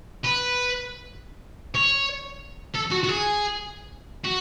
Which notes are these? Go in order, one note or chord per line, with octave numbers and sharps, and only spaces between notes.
B4
C#5
A4
F#4
F#4
G#4
F#4